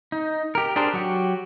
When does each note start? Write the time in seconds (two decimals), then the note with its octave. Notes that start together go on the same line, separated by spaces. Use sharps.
0.12 D#4
0.55 G4 A#4
0.76 D4 G4 G#4 A#4 C5
0.93 F#3 F#4 G4